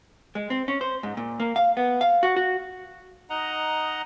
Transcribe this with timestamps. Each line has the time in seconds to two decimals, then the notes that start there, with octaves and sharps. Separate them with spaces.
0.35 G#3
0.50 C4
0.68 C#4
0.81 C5
1.03 G#2
1.17 A#2
1.40 A#3
1.56 F5
1.77 B3
2.01 F5
2.23 F#4
2.36 F#4
3.30 D#4 D#5 F#5 A#5